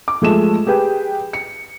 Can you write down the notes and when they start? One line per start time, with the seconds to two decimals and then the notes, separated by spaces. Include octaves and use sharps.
0.08 D6
0.22 F3 G#3 A3 E7
0.67 G4 G#4 B4 G5
1.33 C#7